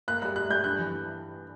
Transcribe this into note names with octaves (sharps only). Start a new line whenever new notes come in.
A#3 F#6
G3 F#6
G3 F#6
G3 G6
G2 F#6
E3